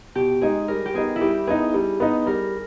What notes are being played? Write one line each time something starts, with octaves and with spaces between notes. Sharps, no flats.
B2 G4
G#3 D#4 G#4
G3 A#4
G4
B3 D#4 G#4
E4
G3 G4
B3 D#4 G#4
G3
B3 D#4
G3 A#4